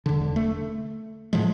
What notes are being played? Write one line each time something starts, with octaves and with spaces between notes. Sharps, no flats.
E1 D3
A3
A2 F3 G#3